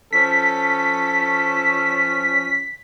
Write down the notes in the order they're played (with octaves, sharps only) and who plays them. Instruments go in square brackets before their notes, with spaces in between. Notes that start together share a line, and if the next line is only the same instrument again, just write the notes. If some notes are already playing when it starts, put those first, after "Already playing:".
[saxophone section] F3 C#4 [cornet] A4 [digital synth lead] B6